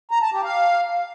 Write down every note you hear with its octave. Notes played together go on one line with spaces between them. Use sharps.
A#5
A5
G4
F5